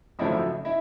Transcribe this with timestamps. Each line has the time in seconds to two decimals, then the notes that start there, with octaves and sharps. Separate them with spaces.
0.19 G#1 F#2 C#3 F3 A3 E4 E5
0.65 E4 E5